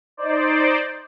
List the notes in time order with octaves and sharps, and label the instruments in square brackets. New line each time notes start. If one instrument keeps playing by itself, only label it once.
[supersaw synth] D#4 C5 D5